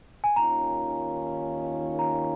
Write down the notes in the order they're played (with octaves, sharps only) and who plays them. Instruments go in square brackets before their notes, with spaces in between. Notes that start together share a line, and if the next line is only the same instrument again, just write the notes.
[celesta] G#5
[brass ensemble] D#2 D#3 C#4 F4 [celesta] A#5
[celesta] A#5